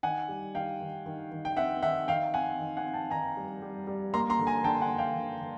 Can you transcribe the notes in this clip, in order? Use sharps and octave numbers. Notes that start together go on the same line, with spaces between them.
D#3 F#5 G#5
G3
D#3 F5 G5
D#3
D#3
D#3
G5
C4 E5 F#5
D#3 E5 F#5
D#3 F5 G5
C4 F#5 G#5
D#3
F#5 G#5
C4
G5 A5
D#3 G#5 A#5
G3
G3
G3
A#3 A#5 C6
A#5 C6
D3
G#5 A#5
D3 G5 A5
F#5 G#5
D3
F5 G5
D3
D3